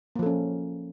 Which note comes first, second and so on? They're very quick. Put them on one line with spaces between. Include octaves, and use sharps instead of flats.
A#3 F3 A4 C#4